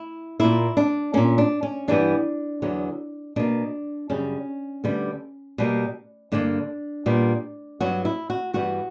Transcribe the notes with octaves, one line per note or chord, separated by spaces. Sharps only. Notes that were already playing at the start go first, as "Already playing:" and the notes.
Already playing: E4
A#2 A#3 E4
D4
A#2 A#3 C#4
D4
C#4
G2 E3 G3 B3 D4
E2 D3 F#3 B3
B2 A#3 D4
F#2 C#3 G3 C#4
D2 D3 G3 B3
B2 G3 A#3
G2 D3 A#3 D4
A#2 G3 B3
G2 F#3 B3 F#4
E4
F#4
G2 E3 G3 B3 F#4